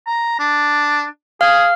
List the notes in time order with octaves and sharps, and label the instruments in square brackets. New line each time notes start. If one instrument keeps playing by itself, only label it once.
[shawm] A#5
D4
[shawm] G#4 [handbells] F5 F6